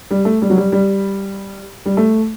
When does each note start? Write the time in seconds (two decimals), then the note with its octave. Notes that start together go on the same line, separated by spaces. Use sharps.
0.11 G3
0.25 A3
0.42 G3
0.50 F#3
0.57 G3
0.72 G3
1.86 G3
1.97 A3